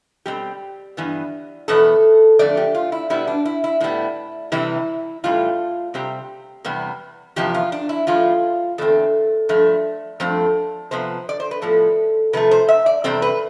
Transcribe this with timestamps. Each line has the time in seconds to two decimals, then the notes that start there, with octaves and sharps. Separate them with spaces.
0.26 B2 G3 C4 G4
0.97 G2 E3 B3
1.68 E2 B2 B3 A4
2.39 F2 D3 A3 D5
2.57 G4
2.75 F4
2.92 E4
3.10 B2 G3 B3 E4
3.27 D4
3.45 E4
3.64 E4
3.80 A2 G3 B3 E4
4.52 C3 E3 G3 E4
5.24 A2 E3 G3 F4
5.94 C3 G3 C4 G4
6.65 E2 C3 G3 B3
7.36 E2 C3 F3 B3 G4
7.54 F4
7.72 D4
7.89 E4
8.07 A2 F3 A3 F4
8.78 E2 D3 A3 C4 A4
9.49 G2 F3 A3
10.20 G2 F3 A3 C4
10.91 C3 F3 B3 C5
11.29 D5
11.40 C5
11.51 B4
11.62 A2 F3 B3 A4
12.33 C3 F3 A3 B4
12.51 C5
12.69 E5
12.86 D5
13.04 E2 C3 G3 C4 A4
13.22 B4